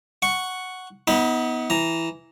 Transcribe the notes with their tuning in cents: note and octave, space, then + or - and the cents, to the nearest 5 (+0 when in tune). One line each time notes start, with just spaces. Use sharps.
F#5 +0 C#6 +0
B3 +0 D#4 +40 B5 +0
E3 +0 A#5 +0